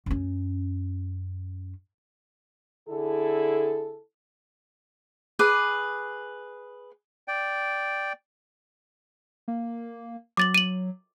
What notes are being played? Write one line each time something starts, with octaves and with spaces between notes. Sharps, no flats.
F#2 C#4
D3 E4 G#4 A4
G#4 B4 D6
D5 G5
A#3
F#3 D6 A6 F#7
D#7 F#7